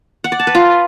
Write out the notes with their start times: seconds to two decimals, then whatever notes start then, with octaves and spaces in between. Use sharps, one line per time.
0.24 F#5
0.32 D5
0.39 A5
0.47 B4
0.55 F4